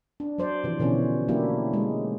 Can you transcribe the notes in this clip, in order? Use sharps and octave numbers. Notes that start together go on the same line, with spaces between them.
D4
F#3 C5 D5
C3 E3 F3
B2 D3 E3 C#4
F#3 A3 A#3 D4 E4 G4
G#3